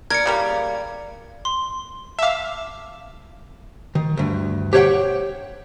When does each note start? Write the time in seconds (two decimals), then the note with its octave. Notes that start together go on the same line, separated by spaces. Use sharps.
0.10 A#4 D5 G#6 C#7
0.26 C#3 G3 A#3
1.45 C6
2.19 E5 F5 A5 D6
3.95 D#3
4.17 D2 G2
4.73 G4 C5 C#5 E5 F#5 G5